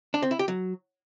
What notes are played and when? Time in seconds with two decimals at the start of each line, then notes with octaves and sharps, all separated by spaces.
0.14 D4
0.22 C4
0.31 E4
0.39 G4
0.48 F#3